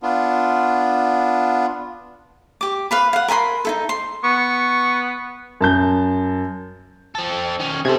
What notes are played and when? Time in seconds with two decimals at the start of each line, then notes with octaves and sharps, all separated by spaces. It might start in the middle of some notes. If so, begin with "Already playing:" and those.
0.03 B3 D4 F4
2.61 G4 D6
2.91 B4 F5 B5
3.13 F5 F#5
3.28 A#4 G#5 B5 C6
3.65 D#4 E4 A4
3.89 C6
4.24 B3 C#6
5.61 F#2 A5 G6
7.15 C4 A4
7.60 D#3 C#4
7.85 C3 G#4 A4 C5